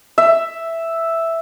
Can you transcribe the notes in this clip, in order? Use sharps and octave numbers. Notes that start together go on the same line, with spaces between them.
E5